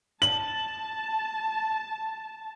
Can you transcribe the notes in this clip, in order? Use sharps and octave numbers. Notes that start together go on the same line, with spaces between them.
A5 F#7